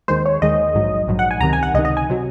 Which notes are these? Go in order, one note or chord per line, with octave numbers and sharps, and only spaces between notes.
D#2 D#3 G#3 C5
C#5
D#2 D#3 G#3 D#5
A#1 G#2 F#3
A#1 G#2 F#3
F#5
G#5
C#2 C3 D#3 A#5
G#5
F#5
C#2 C3 D#3 D#5
D#5
G#5
C3 F#3